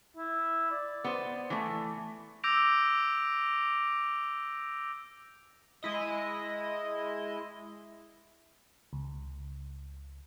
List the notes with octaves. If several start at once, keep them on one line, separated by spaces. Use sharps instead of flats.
E4
D5
B3 C5
E3 A3
D6 E6 G6 A#6 D7 F7
G#3 E4 D#5
C#2